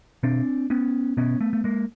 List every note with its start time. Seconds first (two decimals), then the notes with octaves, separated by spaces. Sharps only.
0.23 B2 C4 D4
0.70 B3 C#4
1.17 B2 B3 C#4
1.41 A3 B3
1.53 A3
1.64 G#3 A#3